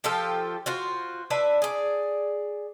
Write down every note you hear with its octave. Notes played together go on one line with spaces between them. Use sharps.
F3 F4 G4 A4
F4 F#4 C5
D4 B4 E5
G#4 D5